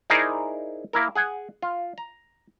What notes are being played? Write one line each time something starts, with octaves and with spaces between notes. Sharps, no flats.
D#4 E4 G#4 A#4 C5 D5
A#3 E4 A#4
G#4 F#5 G#5
F4
A#5